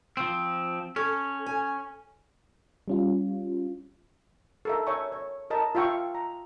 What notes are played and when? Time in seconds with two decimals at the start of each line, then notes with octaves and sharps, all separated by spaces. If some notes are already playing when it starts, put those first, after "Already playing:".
0.17 F3 C4
0.96 C#4 A4
1.46 G#5
2.88 G3 C#4 F4
4.65 A4 A#4 E5
4.87 C#5 E5 G#5 C#6
5.12 C#5
5.50 A#4 D#5 A5
5.75 F4 E5 F5 G5 C#6
6.15 A#5